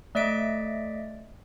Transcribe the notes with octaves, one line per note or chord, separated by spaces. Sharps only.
A3 D5 D#5 B6 D7